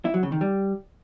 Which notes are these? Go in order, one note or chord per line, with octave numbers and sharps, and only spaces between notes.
E4
F#3
C#3
D#3
G3